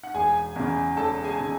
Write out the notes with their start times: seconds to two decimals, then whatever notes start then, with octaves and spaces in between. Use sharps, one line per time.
0.03 F#5
0.14 E1 G#4 G#5
0.56 E2 C#3
0.97 E1 A4 A5
1.24 G#4 G#5
1.40 C#3